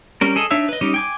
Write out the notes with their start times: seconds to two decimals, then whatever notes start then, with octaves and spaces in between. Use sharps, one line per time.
0.21 G3 C#4 A#4
0.36 G#4 A4 D#5
0.51 D4 D#4 C#5 E5 E6
0.69 B4 D#5
0.81 G3 C#4 D#4 G4 D#5
0.94 G5 G#5 D6